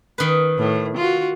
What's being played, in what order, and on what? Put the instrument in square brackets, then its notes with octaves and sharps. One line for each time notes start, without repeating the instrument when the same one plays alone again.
[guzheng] D#3 B4
[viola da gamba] A2
F4 F#4